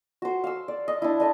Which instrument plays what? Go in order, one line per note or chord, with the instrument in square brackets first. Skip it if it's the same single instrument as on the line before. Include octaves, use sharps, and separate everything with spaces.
[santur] F#4 C5
F5 E6
D5
D#5
D4 E4
D4 D#5 A5